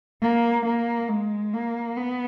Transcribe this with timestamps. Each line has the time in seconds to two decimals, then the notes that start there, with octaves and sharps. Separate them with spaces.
0.22 A#3
0.66 A#3
1.09 G#3
1.53 A#3
1.97 B3